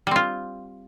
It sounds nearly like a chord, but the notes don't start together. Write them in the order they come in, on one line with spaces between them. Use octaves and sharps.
G3 C4 F4